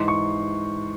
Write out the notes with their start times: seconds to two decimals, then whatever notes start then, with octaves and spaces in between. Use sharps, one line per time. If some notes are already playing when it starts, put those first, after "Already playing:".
Already playing: G#2 E3 C6
0.08 C#6